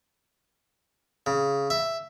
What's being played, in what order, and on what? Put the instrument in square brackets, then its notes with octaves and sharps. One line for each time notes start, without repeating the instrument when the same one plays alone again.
[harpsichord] C#3
E5